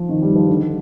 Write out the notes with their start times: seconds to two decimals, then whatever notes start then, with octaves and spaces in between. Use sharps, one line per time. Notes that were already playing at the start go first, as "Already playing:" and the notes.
Already playing: F3
0.09 D#3
0.22 G3
0.35 F3
0.49 D3